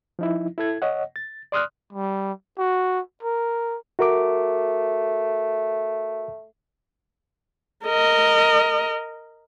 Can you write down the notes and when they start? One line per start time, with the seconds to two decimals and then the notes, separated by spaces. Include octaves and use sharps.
0.19 F3 D#4 E4
0.58 E4 A4 G#6
0.82 C#5 D#5 F#5
1.16 A6
1.52 D5 C6 D#6 F6 F#6
1.93 G3
2.58 F#4
3.23 A#4
3.99 A3 F#4 A#4 D6
7.86 A#4 D#5